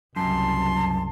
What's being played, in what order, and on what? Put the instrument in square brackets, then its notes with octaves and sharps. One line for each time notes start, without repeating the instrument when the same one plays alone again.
[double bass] F#1 C2 [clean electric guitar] F#2 [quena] A5 [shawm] C6